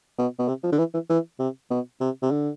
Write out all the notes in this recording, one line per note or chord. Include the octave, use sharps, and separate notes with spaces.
B2
B2
C3
F3
D3
E3
E3
E3
C3
B2
C3
C3
D3